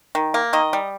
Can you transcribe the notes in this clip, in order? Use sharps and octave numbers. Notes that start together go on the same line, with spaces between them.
D#3
A#3
D#3 D#5
G3